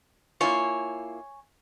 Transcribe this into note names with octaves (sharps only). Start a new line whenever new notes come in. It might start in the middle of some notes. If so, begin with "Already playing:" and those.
A#3 E4 F4 C#5 G#5